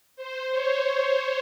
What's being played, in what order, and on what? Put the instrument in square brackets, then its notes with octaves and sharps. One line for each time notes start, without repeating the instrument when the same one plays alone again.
[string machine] C5
C#5